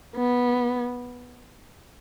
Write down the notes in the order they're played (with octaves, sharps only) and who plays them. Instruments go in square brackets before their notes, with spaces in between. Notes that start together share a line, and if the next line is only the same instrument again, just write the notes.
[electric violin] B3